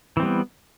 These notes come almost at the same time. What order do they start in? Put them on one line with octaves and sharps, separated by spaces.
E3 C4 G3 B3